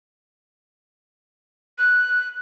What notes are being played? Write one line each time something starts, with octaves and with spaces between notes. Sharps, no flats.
F#6